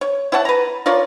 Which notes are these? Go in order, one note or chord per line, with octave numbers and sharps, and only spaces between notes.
C#5
E4 C#5 F#5 A5
B4 A#5
F4 A#4 C#5 D5